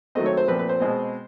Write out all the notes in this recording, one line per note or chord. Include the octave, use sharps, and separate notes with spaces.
D#3 F#3 A3 C4 D#5
C#5
C5
A#2 F3 A3 C4 B4
B4
C5
B2 G#3 C4